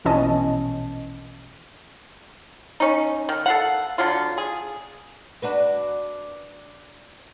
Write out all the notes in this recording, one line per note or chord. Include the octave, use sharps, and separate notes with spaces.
A#1 B2 E3 C#4 D#5 A5
C#4 D#4
D#3
A4 F5 F#5
D3 F#3 F4
G#4
D4 F#4 B4